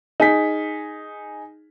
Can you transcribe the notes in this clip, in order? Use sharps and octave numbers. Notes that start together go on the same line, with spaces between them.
D#4 G#4 B6